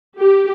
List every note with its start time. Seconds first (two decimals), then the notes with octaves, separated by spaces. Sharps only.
0.19 G4